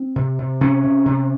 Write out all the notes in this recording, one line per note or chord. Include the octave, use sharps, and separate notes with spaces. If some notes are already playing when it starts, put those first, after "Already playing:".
Already playing: C4
C3
C3
C3 C#4
C3
C3